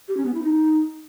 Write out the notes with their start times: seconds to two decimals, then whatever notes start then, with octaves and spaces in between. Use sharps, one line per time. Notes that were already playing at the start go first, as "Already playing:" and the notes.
0.08 G4
0.17 C#4
0.26 B3
0.34 E4
0.43 D#4